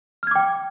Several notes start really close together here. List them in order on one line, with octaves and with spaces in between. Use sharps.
F6 G#6 D6 G5